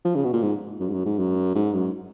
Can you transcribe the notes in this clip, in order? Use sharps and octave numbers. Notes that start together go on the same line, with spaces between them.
F3
C#3
B2
A#2
G#2
F#2
G#2
F#2
G#2
F#2
G#2
F#2